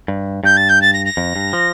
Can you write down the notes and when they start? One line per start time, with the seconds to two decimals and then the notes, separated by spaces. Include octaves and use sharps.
0.08 G2
0.44 G2 G6
0.56 A6
0.69 G6
0.81 A6
0.93 A#6
1.05 A#6
1.17 F2
1.36 G2
1.53 F3